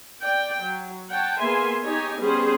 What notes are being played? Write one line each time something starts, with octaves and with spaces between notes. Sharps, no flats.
D5 G5
F#3
C#5 F#5 G5 A5
A#3 B3 G#4 E5 G#5 C6
D#4 G4 C#5 D#5 G#5
G3 B3 C#4 G#4 C5